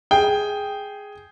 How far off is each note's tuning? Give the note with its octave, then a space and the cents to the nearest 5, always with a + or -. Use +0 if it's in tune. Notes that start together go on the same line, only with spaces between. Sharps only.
G#4 +0 G5 +0